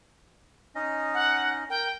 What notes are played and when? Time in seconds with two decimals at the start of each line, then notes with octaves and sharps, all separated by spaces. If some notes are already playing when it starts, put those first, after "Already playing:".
0.75 C#4 D#4 D#5
1.14 F#5
1.70 A#4 G5